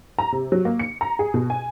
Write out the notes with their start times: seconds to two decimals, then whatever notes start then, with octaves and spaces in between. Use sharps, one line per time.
0.19 A#5
0.32 C3
0.52 F#3
0.65 A#3
0.79 C#7
1.01 A#5
1.19 G#4
1.34 B2
1.50 G#5